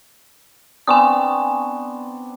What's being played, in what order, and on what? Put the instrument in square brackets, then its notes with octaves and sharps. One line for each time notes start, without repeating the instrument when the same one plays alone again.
[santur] B3 C4 D4 [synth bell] G#5 C#6 D#6